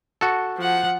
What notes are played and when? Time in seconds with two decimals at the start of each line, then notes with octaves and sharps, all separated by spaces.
0.21 F#4 A4
0.58 F3 F#5